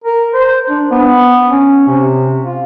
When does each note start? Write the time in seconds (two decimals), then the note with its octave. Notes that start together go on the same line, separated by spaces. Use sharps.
0.04 A#4
0.34 C5
0.69 D4
0.91 B3
1.51 C#4
1.88 C3
2.43 F4